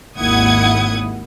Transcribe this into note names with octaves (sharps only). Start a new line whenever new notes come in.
G#1 D#2 E4 F#5 D#6 G#6